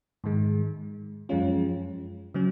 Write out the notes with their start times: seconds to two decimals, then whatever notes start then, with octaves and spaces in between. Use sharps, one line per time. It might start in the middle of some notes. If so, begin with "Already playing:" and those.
0.24 G#2 D#3 G#3
1.29 F#2 F3 G#3 C#4 F4
2.35 C#3 F#3 C#4